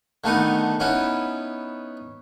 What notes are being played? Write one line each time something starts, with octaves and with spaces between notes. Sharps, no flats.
D3 D#3 A3 B3 D#4
B3 C#4 D#4 E4